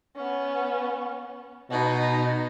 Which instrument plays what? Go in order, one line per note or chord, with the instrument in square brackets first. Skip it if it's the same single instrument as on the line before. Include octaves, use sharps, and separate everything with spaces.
[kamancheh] B3 C#4
[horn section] B2 [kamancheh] D#4